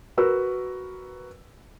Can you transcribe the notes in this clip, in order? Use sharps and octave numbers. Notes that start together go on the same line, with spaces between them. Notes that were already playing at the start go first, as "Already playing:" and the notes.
F#4 A#4 B4 E6